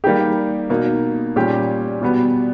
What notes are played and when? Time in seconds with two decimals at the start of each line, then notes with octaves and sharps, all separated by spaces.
0.04 G3 A#3 D#4 G4
0.70 B2 A#3 D#4
1.36 A#2 G3 C#4 G4
2.02 B2 G3 B3